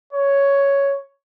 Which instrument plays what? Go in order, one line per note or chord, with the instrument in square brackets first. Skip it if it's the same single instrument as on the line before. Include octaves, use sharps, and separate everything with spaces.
[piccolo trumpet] C#5